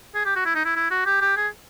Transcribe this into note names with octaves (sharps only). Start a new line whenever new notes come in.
G#4
G4
F#4
E4
D#4
E4
E4
F#4
G4
G4
G#4